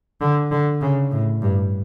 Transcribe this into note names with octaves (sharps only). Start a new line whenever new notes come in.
D3
D3
C#3
A2
G2